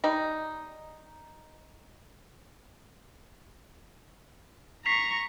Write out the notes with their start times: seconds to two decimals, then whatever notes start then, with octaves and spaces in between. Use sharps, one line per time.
0.04 G3 D#4
4.86 A#5 C#6 B6 C7 F7